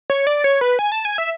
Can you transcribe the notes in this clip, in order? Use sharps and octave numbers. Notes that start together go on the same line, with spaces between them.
C#5
D5
C#5
B4
G#5
A5
G#5
E5